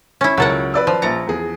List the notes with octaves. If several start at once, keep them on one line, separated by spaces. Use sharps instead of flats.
C#4 E4
C#2 F#3 A4 A#4 C#5 F#5
B4 D5 E6
F3
A#1 A#5 A6 C#7
E2 G#4